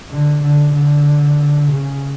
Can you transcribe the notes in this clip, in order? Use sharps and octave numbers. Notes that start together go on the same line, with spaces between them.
D3
D3
D3
C#3